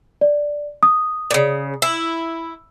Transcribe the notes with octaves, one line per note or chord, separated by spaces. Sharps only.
D5
D#6
A#2 C#3
E4